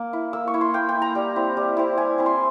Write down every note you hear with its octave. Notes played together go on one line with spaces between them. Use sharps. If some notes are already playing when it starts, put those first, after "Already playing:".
Already playing: A#3
E4
A#3 E6
C#6
E4
C6
A#3 G5
G5
E4
A#5
G3
C4 E4
G3
C4 E4
G3 G#5
C4 E4
C6